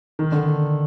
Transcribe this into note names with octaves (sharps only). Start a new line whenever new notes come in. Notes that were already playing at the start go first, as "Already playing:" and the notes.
D#3
D3